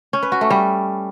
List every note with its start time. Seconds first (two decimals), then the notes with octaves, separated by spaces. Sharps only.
0.13 C#4
0.23 B4
0.32 F#4
0.41 A3
0.50 G3